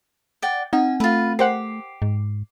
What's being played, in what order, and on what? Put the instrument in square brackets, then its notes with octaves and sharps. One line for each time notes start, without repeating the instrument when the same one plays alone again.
[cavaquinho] D5 F#5 G5
[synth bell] C4 F#5 [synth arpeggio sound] D#4 [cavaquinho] G#5
[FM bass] A3 [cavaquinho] F4 B4
[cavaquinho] G4 [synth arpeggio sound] A#4 C5 F#5 [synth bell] C7
[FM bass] G#2